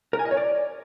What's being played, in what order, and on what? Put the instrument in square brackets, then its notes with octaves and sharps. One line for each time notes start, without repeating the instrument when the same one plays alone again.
[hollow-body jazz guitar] A#4
G#5
D#5
C#5
D5